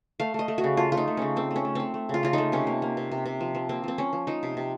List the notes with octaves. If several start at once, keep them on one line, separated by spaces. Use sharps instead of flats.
A3 F5
A3 D#5
A3
F#4
C#3
A3 F4
A3 F4
D#4
A3
C#3 C#4
A3 C4
A3
C#4
A3
A3 C4
A3
C#3 F4
C#3 F4
A3 D#4
C3 C#4
A#3
A#3
C3
C3
C3
F3
F3
A#3 C4
F3 C4
F3 C#4
F3
F3 D#4
C3
C3